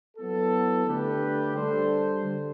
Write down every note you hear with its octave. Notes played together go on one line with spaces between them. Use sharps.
F#3 B3 E4 A4
D3 A3 D4 G4 B4
G3 D4 A4 C5
D3